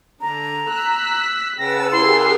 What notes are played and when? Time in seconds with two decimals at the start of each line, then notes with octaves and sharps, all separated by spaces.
0.21 D3 D4 A#5
0.70 E6 F#6 B6
1.59 C#3 B4 F#5 G5 A5 E6 A#6
1.92 E4 G4 G#4 A#4 C6